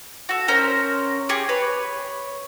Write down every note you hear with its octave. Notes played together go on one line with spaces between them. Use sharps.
F#4 A4
C#4 A#4 C5 A#5
G4 G#4 C#6
B4 C#5